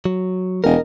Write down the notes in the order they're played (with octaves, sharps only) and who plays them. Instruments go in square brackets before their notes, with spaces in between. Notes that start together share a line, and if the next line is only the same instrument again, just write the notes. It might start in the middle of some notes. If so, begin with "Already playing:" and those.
[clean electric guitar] F#3
[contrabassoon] E1 [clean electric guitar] A#4 D#5